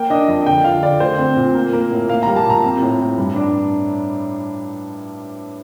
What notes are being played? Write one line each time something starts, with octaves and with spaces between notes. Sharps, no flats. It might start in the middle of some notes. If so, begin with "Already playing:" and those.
Already playing: A#3 G5
D4 D#5
F2 D#5
D3 G5
F4 F5
D3 D5
A3 C5
C4
A#2
A#3
A#3
A2
A#3 F5
G3 A#5
A5
A#2 A#5
C4
A2
A2
G2
D4